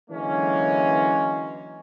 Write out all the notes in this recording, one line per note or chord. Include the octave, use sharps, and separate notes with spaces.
D3 E3 F#3 G#3 A#3 C#4